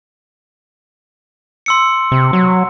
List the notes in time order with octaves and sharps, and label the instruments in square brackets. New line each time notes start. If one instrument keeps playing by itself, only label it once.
[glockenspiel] C6 E6 C#7
[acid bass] C3
F#3